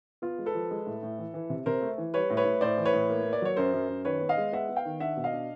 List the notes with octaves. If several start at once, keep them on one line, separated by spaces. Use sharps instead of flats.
B3 F4
G#3
A4 B4
F3
G#3
A2
A2
E3
E3
C3
C3 A#4 C5
A3
E3
G3 B4 C#5
A2
B4 C#5
A2
A2 C5 D5
E3
B4 C#5
A2
A#3
A#3
D5
F#3 C#5
F#2 A#4 C5
F#2
F#2
D#3 B4 C#5
B3
D#5 F5
G#3
B3 E5 F#5
B3
F5 G5
D#3
D4 E5 F#5
B2
D#5 F5
D4